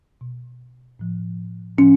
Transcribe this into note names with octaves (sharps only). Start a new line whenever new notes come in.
B2
A2 F3
A2 F3 C#4